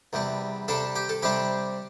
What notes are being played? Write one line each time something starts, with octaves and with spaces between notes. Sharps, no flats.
E2 C3 G3
C3 G3 D4 A4
G4
A4
C3 G3 D4 G4